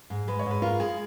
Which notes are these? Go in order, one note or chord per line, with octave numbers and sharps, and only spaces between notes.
G#2
G#3 B4
C#5
G#2 B4
F4 A#4
G#3 G#4